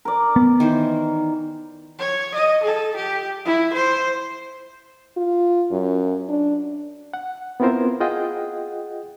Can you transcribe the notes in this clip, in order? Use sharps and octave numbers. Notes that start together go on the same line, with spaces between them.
A#4 D5
B3
D#3 E3 C5
C#5
D#5
A4
G4
E4
C5
F4
F#2
D4
F#5
B3 C4 E4 F4 A#4 C5
F4 G#4 D#5 F#5 G5